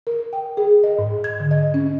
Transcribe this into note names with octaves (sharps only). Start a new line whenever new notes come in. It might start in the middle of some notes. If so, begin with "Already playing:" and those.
A#4
G5
G#4
D#5
G#2
G#6
D3
D#5
C#4